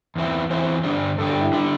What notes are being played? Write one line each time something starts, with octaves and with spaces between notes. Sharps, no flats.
E2 E3 C4 E4
E2 E3 C4 E4 C5
G2 D3 G3 D4
G2 D3 G3 D4 A4
G4
E4
D3 G3 D4